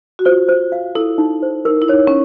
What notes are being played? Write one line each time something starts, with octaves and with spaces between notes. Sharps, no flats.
F#4
F4 C5
C5
F5
E4 A4
D#4
C5
D#4 A#4
E4
D#4 C#5
C#4